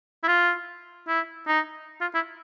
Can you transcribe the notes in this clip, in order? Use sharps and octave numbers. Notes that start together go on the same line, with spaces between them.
E4
F4
E4
D#4
F4
E4